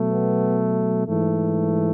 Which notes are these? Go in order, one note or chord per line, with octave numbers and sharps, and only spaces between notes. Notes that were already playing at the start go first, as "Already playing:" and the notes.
Already playing: B2 F#3 A3
B3
G#2 E3 A3